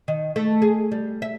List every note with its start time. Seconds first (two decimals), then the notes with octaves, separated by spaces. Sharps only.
0.08 D#3
0.36 A3
0.62 G#4
0.92 G3
1.22 E5